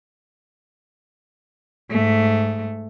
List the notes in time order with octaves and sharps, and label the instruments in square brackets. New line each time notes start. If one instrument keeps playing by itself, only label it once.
[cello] G#2 A3